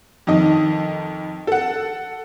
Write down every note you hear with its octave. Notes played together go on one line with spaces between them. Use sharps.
F2 D#3 D#5
A4 F#5